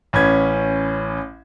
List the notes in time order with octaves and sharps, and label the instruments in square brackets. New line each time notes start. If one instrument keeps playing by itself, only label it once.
[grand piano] A1 C#4 B5 G#6